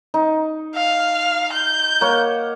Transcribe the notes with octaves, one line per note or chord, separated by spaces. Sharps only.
D#4
F5
G6
A#3 C#5 F#5